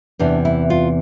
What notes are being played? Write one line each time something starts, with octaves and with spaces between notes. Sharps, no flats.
E2 C3 E3 D4
E4
F4